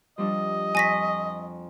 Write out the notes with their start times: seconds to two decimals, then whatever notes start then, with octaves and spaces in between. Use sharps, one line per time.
0.18 F3 G3 D4 D#5
0.75 F2 G#5 C#6 A#6 B6